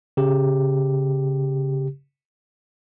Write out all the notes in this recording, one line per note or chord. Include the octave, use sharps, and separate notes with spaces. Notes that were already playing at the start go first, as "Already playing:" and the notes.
C#3 G4